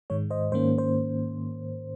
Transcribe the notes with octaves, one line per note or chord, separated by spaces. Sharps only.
G#2 D#3 G#3 C#5
C5 D#5
G#2 D#3 A#3 C#4 C5
C5